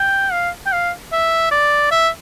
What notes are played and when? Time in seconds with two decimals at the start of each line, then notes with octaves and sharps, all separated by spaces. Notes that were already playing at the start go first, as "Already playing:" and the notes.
Already playing: G5
0.32 F5
0.66 G5
0.72 F5
1.12 E5
1.51 D5
1.91 E5